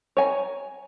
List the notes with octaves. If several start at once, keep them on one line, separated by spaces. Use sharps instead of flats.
C#5 G#5 A#5